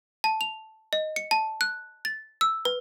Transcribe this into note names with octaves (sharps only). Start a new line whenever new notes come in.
A5
F7
D#5
C#7
A5
F#6
A6
E6
B4